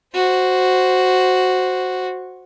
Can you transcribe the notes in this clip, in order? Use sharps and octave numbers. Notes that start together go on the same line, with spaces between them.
F#4 C5